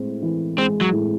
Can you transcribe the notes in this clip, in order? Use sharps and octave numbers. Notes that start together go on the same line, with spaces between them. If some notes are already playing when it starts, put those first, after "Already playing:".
Already playing: A2 G#3 C4
E3
G#3 C4
F#3
A2